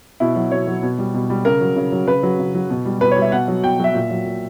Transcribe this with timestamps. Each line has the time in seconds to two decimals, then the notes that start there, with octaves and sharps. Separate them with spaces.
0.20 B2 E4
0.36 F#3
0.52 B2 C#5
0.67 F#3
0.83 B2
0.99 G3
1.14 B2
1.30 G3
1.45 C#3 A#4
1.61 F#3
1.76 C#3
1.92 F#3
2.08 C#3 B4
2.23 F#3
2.39 C#3
2.55 F#3
2.70 B2
2.85 G3
3.01 B2 B4
3.11 C#5
3.17 G3
3.22 E5
3.32 B2 F#5
3.48 F#3
3.63 B2 G5
3.80 F#3 E5
3.95 A#2
4.10 F#3
4.26 A#2